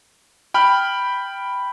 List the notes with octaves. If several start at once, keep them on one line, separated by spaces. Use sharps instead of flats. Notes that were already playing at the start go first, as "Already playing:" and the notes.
G5 B5 F6